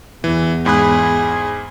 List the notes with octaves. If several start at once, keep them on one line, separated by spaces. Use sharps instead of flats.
E2 E3
G#2 G#4 B5 F#6